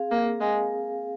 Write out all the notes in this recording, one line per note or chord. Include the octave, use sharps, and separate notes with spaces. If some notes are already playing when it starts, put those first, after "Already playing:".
Already playing: C4 G#4 F5
A#3
G#3